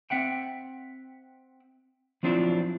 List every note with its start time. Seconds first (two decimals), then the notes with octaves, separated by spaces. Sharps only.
0.10 C4 E5 F#5 G5
2.23 F3 F#3 C4 D4 E4 F4